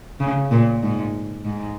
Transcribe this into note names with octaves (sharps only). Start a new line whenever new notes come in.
C#3
A#2
G#2
G#2